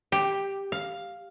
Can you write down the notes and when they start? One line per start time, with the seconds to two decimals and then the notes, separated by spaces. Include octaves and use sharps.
0.12 G4
0.72 F5